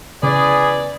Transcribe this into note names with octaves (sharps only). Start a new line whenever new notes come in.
E2 C#3 G#4 B4 D5